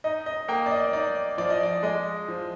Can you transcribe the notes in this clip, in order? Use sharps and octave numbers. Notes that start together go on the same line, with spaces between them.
D#4 D#5
D#5
A#3 G5
D5
D#5
D#4 D5
F3 D5
D#5
D5
G#3 D#5
F3